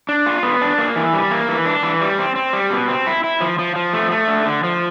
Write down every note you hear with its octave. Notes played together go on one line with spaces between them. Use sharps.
D4
F4
B3
D4
A#3
E3
G3
A#3
E3
D4
E3
G3
C4
C4
G3
B2
C4
E4
E4
F3
F3
F3
A3
A3
D3
D3
F3